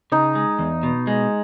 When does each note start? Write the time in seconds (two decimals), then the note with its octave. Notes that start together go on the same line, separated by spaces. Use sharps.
0.12 C#3 D#4
0.35 G#3
0.59 E2
0.83 B2
1.07 G#3